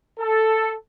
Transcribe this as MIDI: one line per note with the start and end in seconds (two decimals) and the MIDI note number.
0.20 0.74 69